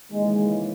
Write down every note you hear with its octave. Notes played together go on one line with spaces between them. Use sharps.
D#2 C#3 E3 G#3